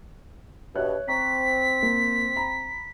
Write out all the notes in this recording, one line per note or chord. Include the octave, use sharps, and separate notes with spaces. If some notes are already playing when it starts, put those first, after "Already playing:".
G2 B2 C#5 E5 F#6
C4 A#5 C#6 B6
A#3
A#5 B5